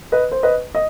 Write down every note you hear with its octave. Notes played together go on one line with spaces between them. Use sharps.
B4 D#5
C5
B4 D#5
D#5